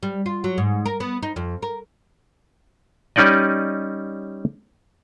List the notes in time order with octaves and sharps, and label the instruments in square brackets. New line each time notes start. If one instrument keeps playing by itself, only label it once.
[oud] G3
F4
F#3
G#2
A#4
B3
D#4
F2
A#4
[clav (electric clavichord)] G3 C#4 D#4 D5 D#5